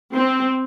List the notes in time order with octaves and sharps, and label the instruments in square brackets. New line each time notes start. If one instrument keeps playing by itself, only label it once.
[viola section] C4